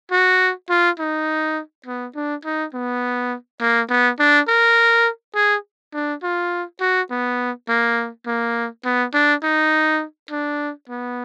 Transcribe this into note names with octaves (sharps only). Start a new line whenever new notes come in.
F#4
F4
D#4
B3
D4
D#4
B3
A#3
B3
D4
A#4
G#4
D4
F4
F#4
B3
A#3
A#3
B3
D4
D#4
D4
B3